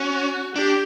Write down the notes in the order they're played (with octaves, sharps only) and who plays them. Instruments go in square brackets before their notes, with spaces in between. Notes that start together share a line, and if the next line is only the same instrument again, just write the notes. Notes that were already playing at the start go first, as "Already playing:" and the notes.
Already playing: [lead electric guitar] C#4 [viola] F#4
[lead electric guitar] D4 [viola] G4